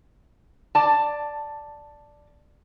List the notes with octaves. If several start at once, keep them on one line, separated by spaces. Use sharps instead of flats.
D5 A5